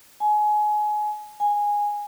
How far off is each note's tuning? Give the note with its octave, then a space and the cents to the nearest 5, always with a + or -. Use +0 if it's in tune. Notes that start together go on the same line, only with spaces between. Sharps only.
G#5 +25
G#5 -10